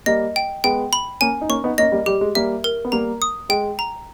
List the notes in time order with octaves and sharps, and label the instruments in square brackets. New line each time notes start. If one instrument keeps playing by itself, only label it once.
[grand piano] G3 A#3 [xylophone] D#5
[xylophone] G5
[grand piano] G#3 B3 [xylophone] G5
[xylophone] B5
[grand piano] A#3 C#4 [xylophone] G#5
[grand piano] D#4
[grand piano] A#3 C#4 [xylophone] C#6
[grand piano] B3 D#4
[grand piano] A#3 C#4 [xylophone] D#5
[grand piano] G3 A#3
[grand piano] G3 [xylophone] G4
[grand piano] G#3
[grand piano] G3 A#3 [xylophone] E5
[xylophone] A#4
[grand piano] B3
[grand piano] G3 A#3 [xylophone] A#5
[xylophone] D#6
[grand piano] G#3 [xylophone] G5
[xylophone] A#5